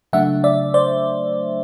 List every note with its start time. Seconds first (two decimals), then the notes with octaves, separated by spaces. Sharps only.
0.13 C#3 F#3 A3 D4 E5 F#5
0.44 D5 E5
0.74 C5 D5